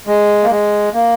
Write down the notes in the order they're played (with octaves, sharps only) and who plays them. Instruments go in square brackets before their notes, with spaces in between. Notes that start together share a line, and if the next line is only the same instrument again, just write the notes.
[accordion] G#3
A#3
G#3
A#3